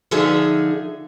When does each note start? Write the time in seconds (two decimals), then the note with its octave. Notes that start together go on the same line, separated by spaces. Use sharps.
0.11 D3 F3 D#4 G#4 E5